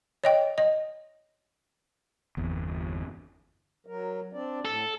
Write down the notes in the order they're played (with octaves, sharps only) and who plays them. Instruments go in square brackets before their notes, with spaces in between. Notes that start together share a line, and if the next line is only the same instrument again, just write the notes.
[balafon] C#5 D#5 G5
D#5
[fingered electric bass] G1 E2
[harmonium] F#3 A#4
C4 D4 D5
[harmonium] A2 [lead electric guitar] A4